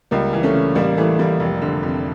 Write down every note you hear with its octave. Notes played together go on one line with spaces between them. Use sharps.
C#2 G3 A#3
E3
A3 C#4
C#3
A1 G3 A#3
E3 A3
A2 G3 A#3
F1
D3
F2